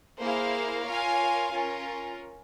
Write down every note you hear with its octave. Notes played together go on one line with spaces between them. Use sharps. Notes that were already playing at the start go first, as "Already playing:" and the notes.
A#3 E4 G#4 C5 F5
F4 A#4 C#5 F5 G#5
C#4 F4 A#4